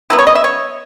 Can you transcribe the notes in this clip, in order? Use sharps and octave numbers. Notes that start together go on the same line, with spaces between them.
C#3 F#3 B3 E4
C#5
D#5
E5
C#5